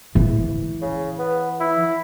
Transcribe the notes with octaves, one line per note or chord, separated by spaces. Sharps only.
E3
C#3
B3
E4